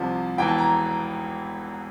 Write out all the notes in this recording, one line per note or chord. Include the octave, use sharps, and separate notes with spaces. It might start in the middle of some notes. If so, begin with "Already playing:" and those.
Already playing: C2 C3 F3 A5
E1 E2 E3 G5
A5
A#5